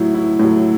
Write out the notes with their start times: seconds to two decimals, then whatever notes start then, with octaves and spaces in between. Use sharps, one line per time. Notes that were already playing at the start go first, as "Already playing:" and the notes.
Already playing: A2 F#3 E4
0.15 E4
0.39 A2
0.44 F#3